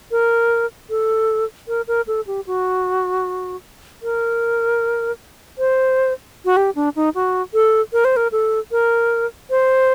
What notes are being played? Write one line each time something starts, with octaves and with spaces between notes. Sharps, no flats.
A#4
A4
A#4
A#4
A4
G4
F#4
A#4
C5
F#4
G4
D4
D#4
F#4
A4
A#4
C5
A#4
A4
A#4
C5